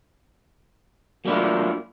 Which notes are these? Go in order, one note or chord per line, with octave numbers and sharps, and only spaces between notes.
F#3 A3 A#3 D4 E4 F4